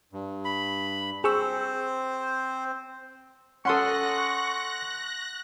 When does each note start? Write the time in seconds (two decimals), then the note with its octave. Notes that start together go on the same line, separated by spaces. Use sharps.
0.13 G2
0.45 B5
1.24 C4 G#4 C5 C#6 E6
3.65 C#4 A4 F#5 C6 C#6 D#6 F#6 A#6